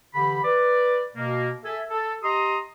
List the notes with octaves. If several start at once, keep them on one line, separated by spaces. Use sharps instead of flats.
D3 E3 G4 B5
B4 D5
B2 A#3
A4 E5 G#5
A4
G4 D#5 A#5 C6 D#6